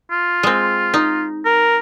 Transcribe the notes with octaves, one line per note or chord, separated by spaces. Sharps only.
F4
G#3 C4
D#4
A#4